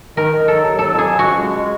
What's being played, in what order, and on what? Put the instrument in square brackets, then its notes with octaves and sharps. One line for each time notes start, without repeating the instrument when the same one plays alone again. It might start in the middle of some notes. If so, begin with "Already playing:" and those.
[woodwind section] D#3 [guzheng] A#4
[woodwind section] D#3
[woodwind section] F#3 [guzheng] A4
[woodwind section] D#2
[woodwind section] F#3 [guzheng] A4
[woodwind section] F2
[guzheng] G#4
[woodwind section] F2
[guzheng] F#4
[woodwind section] C#3
G#3
G#3